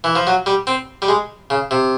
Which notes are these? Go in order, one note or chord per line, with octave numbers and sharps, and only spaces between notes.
E3
F3
F#3
G3
C4
G3
G#3
C#3
C3